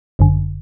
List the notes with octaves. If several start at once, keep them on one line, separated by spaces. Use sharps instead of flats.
G1 F#2 D3